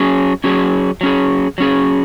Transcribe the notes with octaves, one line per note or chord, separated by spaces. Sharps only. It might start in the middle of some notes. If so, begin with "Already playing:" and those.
Already playing: F#3 C#4 G#4
F#3 C#4 G#4
F#3 C#4 G#4
F#3 C#4 G#4